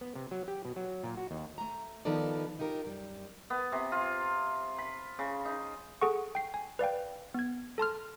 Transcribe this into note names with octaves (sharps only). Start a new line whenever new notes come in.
B3
C3
F#3
G4
B2
F#3
A#2
F#4
D#2
A3 A#5
D#3 F3 B3 D#4 A4 D5
D#4 F4 G4 A#4
F#2 G3
B3
C3
F4
B5
C#3
D#4
G#4 A4 F#5 C#6
G5 C7
G#5
B4 D5 F5 G5
B3 G#6
A4 A5 C6 F6